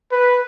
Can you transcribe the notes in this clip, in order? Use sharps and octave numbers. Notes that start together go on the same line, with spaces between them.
B4